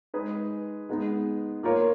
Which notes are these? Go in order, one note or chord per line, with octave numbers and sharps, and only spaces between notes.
G#3 D#4 G#4 B4
G#3 B3 D#4
A#3 F4 A#4 C#5